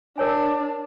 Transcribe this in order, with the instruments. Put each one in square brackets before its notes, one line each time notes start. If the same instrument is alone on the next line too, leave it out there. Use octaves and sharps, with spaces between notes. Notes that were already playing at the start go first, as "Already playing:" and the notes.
[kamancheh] D4 [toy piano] A#4 C#5 G#5